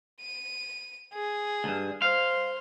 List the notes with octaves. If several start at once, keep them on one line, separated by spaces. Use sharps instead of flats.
D#7
G#4
D2 G2
C5 F5